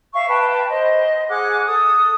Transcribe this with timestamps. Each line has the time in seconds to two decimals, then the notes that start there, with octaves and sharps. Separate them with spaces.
0.13 E5 F5 C#6
0.28 B4 G5 A5
0.68 C5 D#5
1.29 G#4 F#5 D6 F#6
1.66 A4 D#6